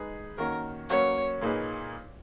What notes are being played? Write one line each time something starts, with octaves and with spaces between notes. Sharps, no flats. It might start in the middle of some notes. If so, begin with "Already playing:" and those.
Already playing: G#3 D#4 G#4 B4
D#3 A#3 C#4 F#4 A#4
F#3 A#3 C#4 F#4 B4 C#5
A#2 A#3 D#4 G#4 B4